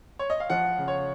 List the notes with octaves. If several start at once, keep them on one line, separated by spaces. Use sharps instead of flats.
C#5
D#5
F5
F3 F#5
C#3
C#5